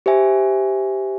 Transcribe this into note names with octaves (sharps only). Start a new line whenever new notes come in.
G4 C5 E5 G#5